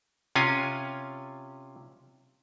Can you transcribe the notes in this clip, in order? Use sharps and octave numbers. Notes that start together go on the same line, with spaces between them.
C3 C#4 F4 G#5